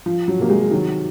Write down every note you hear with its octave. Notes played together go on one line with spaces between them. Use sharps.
F3
F#3
C3 A#3
G#3
D#3 F#3